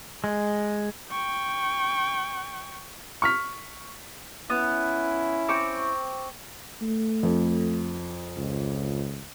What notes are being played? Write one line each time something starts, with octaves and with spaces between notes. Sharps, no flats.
G#3
G5 C#6
C#6 F6 B6
B3 C#4 E4
C4 C#6 D6
A3
F2
C#2